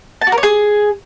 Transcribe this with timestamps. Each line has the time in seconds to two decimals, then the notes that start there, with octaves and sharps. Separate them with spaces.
0.22 A5
0.27 F#4
0.32 A#4
0.38 C#5
0.43 G#4